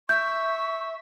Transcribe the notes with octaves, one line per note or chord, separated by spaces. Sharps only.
E5 C#6 G6